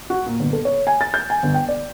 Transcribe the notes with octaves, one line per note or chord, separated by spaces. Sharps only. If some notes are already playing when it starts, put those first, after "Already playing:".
F#4
A#2
G1
A4
C#5
G#5
A6
G6
G#5
G1
G5
D5